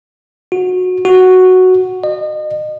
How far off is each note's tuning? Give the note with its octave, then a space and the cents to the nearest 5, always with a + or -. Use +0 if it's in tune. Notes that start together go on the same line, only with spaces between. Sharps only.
F#4 -20
F#4 +0
D#5 -35